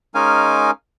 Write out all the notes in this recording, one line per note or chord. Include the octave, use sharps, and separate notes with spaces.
G#3 C#4 D#4 A#4 F5 G#5